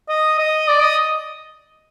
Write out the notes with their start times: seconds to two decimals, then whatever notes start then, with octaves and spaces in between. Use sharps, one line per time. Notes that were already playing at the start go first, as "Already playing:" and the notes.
0.09 D#5
0.38 D#5
0.68 D5
0.82 D#5